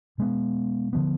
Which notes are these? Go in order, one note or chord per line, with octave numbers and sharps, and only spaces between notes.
B2 G#3 B3
D3 F3 B3